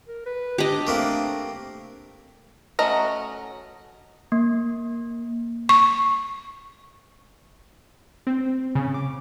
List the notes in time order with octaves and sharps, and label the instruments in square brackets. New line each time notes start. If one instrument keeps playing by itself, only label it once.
[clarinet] A#4
B4
[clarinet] D4 [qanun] G4 D#5
[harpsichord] A3 A#3 C4
[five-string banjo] A3 C#4 F#4 D#5 A#5
[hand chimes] A#3
[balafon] C#6
[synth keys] C4
C#3
D6